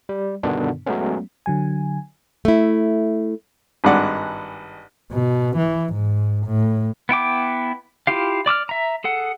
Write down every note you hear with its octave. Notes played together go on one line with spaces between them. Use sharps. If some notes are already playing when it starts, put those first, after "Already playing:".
G3
G2 B2 D3 D#3 B3 D4
F#3 G#3 A3 B3 C#4
D3 F#3 G#5
A3 E4
G#1 G2 G#3 D5 F#5
B2
E3
G#2
A2
B3 E4 G5 D6
E4 F4 G4 F5
D5 D6 E6 F6
E5 A#5
G#4 A4 F#5